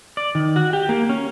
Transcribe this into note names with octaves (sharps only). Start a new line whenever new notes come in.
D5
D#3
F#4
G4
A#3
C#4